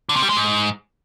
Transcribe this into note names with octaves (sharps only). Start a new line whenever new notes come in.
D3
C3
G3
G#3
G#2